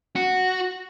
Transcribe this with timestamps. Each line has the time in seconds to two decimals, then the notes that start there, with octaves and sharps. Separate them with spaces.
0.16 F#4